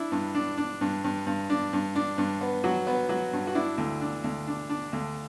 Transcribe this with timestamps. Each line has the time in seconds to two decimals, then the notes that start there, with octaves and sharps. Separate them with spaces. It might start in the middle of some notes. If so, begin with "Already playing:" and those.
Already playing: D4 E4
0.12 G2
0.35 D4
0.58 D4
0.81 G2
1.04 G2
1.27 G2
1.50 D4
1.73 G2
1.95 D4
2.18 G2
2.41 B3
2.64 F#3 F#4
2.87 B3
3.09 F#3 F#4
3.33 G2
3.47 F#4
3.55 D4 E4
3.78 D2
4.01 D4
4.24 D2
4.47 D4
4.70 D4
4.93 D2